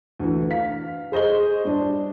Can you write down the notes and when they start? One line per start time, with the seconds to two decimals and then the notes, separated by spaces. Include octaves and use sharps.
0.20 D2 E3
0.50 F5 B6
1.12 G#4 C5 D#5 C#6 G7
1.65 G2 D4